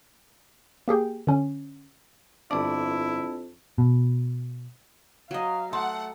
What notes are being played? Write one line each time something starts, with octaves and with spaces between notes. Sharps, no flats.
A#3 G4 G#4 G5
D3 C#4
G1 F2 D4 E4 D5 A5
B2
F#3 D#5 F5
A3 F#5 A5 C6